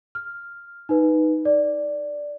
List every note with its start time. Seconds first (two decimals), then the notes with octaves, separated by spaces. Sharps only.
0.15 F6
0.89 D#4 B4
1.45 D5